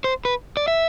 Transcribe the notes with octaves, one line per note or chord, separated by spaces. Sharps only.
C5
B4
D5
E5